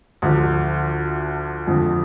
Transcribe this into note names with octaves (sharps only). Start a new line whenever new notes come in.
D2 D3 F3
F2 D3 F3